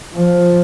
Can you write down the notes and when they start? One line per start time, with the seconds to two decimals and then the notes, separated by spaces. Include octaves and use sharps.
0.14 F3